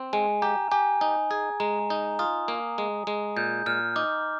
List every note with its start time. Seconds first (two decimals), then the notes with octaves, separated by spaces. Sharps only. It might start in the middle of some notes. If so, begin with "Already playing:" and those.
Already playing: C4
0.13 G#3 G#5
0.42 G4 A#5
0.72 G4 G#5
1.01 D#4
1.31 G#4
1.60 G#3 A#5
1.90 D#4
2.19 F4 D#6
2.48 A#3
2.78 G#3
3.07 G#3
3.37 A#2 G6
3.66 A#2 F6
3.96 D#4 D6